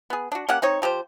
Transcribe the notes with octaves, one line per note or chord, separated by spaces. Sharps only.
B3 G#4
D4 F#4
A#3 C#4 G4 F#5
C4 D#4 C#5
F3 G4 B4 C5